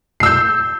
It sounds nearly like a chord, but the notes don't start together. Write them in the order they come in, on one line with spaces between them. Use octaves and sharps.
C7 E6 G6